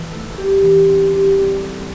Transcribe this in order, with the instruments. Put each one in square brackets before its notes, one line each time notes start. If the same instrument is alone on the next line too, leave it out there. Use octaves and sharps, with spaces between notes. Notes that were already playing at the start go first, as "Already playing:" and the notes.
Already playing: [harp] E3
A3
G4
E3
C4
G4
G3
A4